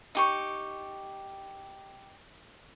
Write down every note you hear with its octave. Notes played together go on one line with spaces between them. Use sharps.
D#4 G4 C#6